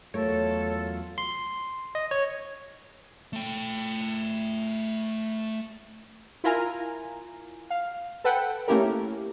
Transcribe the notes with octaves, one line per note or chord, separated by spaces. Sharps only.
E2 F#3 A3 F4 A4 A#4 C#5
C6
D#5
C#5
A3 G5
E4 F4 A#4 G#5 A#5
F5
A4 B4 F#5 G5
A3 A#3 C#4 E4 G4 A#4